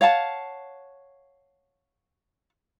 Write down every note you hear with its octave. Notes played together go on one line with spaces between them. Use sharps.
C#5 F5 F#5 A5